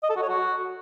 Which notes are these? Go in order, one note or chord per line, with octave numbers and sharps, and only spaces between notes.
D#5
A4
F#4
C#5
F#4